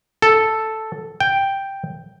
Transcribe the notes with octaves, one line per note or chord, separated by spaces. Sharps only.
A4
G5